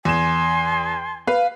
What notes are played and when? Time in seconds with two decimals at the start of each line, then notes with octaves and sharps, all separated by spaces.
0.05 E2 G#5 C6 E7
1.27 B4 F5